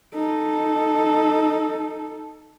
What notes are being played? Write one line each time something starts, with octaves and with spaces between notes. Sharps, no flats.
D#4 A4